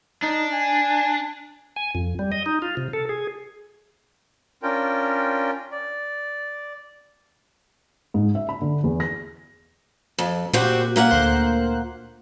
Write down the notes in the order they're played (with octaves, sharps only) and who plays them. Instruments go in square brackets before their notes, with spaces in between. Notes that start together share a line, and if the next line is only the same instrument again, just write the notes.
[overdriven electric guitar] D4 [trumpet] D#4
[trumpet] G#5
[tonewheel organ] G#5
F2
G3
D#5
D#4
F4
C3
A4
G#4
[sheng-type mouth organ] C#4 D4 F4 A#4 G5
D5
[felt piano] G#2
E5
B5
D3
E2
A#6
[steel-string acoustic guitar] F2
[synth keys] A#2 G4 [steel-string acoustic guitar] C4 F#4
[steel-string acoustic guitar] A#2 A#3 F#5
[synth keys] D2 C5 F#6